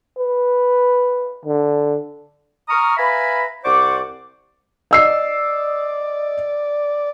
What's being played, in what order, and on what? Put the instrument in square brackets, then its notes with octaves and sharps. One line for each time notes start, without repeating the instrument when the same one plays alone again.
[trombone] B4
D3
[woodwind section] A#5 C#6 D#6 F6
B4 E5 F5 G#5 A#5 B5
C2 C5 D5 F#5 C#6 D6
[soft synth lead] D5 [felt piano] D#5 E6 C7